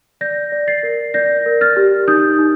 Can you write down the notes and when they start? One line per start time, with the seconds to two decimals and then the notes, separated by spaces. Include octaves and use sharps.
0.21 D5 G6 A#6
0.52 D5
0.68 A6 C7
0.83 A#4
1.14 D5 G6 A#6
1.46 A#4
1.61 F6 A6
1.76 G4
2.08 D#4 D#6 G6
2.38 D#4